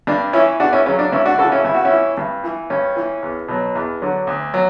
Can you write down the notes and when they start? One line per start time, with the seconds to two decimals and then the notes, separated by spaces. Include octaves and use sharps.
0.07 G2 D4
0.33 E3 C#4 E4
0.60 E2 D4 F#4
0.73 C#4 E4
0.86 C#3 F#3 C#4
0.99 D4
1.12 C#2 C#4 E4
1.25 D4 F#4
1.39 C#3 F#4 A4
1.43 E3
1.52 C#4 E4
1.65 G2 E4
1.74 F#4
1.85 C#4 E4
1.91 E3
2.18 G2
2.44 E3
2.70 G2 C#4
2.96 E3
3.23 E2
3.48 B2 F#3
3.75 E2
4.02 D3 F#3
4.27 D2
4.54 F#3